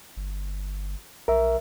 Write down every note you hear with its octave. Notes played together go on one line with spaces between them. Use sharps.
G1
B1 A#4 E5